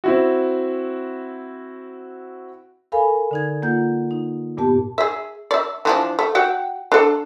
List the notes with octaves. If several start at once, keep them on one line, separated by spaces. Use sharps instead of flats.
C4 E4 F#4
A4 A#4 F5 G#5 B5
D3 D#4 G#6
A#3 F4 F#5 G6
D#4
G2 A#2 B3 G4 A5
G#4 E5
D5 E5
E3 F3 D4
A3
F#4 F#5 G5
D4 A4